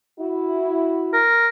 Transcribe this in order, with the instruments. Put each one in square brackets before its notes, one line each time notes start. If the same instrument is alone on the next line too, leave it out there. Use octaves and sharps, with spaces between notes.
[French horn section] E4 F#4
[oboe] A#4